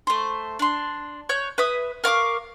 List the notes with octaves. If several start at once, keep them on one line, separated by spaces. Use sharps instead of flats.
A3 C5
D4 C6
C#5 F#6 G6
B4 E5 D#6
A#4 F5 C#6 D6